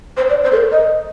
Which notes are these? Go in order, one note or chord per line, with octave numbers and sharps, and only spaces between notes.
C5
D5
C5
A4
A#4
D#5